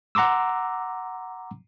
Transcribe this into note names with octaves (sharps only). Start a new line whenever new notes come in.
F#5 A#5 C6 D6 E6